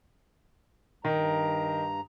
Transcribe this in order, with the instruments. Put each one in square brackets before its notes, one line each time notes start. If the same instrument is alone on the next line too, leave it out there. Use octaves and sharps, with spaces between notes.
[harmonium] G2 A#5 [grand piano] D#3